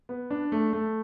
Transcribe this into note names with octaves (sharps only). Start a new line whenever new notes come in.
B3
D4
A3
A3